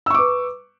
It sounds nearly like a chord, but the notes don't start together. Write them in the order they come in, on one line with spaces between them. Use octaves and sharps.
E6 C#6 D6 B4